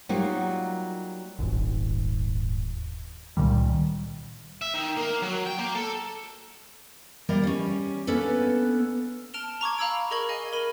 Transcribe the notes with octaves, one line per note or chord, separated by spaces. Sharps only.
F#3 G3 A#3 D#4 F4 F#4
D#1 G#1
C#2 A#2 D#3 G3
E5
D#3
A#3
F#3
G5
A#3
A4
G3 A#3 A#4 D5 D#5
G3 C#4
A#3 B3 C#4 D4 A4 B4
A5 F6 D7 E7 F7 G7
A#5 C#6 D6 G#6
F5 A#5 B5 E6 G#6 D7
G#4 A#4 D#5 C#6 G#6 F#7
D#5 F5 G#5
A#4 B5 D#7